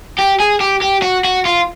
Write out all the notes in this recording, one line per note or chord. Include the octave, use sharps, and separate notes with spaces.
G4
G#4
G4
G4
F#4
F#4
F4